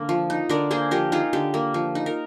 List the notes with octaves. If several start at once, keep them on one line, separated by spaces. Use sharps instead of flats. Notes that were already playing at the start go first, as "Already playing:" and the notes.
Already playing: D3 A#3 D5
F3
D#4
D3 A#4 D5
A#3 G#4 C5
F3 G4 A#4
D#4 F4 G#4
D3 G4
A#3
F3
D#4
A#4